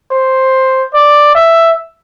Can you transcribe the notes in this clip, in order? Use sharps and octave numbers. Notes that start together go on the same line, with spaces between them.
C5
D5
E5